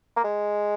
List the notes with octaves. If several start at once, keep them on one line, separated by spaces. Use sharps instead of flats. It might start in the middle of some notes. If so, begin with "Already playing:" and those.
A#3
G#3